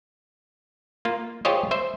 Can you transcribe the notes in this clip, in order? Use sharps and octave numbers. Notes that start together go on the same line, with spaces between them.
A#3 F4
F4 G4 G#4 C5 C#5 D#5
C5 E5